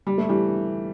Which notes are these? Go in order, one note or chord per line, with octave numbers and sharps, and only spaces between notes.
G3
A3
E3 G3